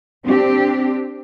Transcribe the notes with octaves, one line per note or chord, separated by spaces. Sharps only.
C4 D4 G4